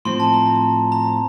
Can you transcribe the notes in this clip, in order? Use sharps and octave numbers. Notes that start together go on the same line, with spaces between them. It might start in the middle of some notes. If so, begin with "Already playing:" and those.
A2 F3 C4 C6
A5
A#5
A#5